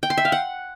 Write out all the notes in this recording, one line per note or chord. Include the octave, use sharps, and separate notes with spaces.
G5
C6
E5
F5
F#5